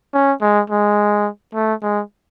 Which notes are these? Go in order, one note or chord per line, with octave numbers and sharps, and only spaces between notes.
C#4
G#3
G#3
A3
G#3